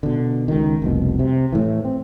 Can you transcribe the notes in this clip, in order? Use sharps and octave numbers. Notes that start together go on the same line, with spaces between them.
B2 D3
C#2 D#3
F1 C2 B2
C3
A2 E3
C4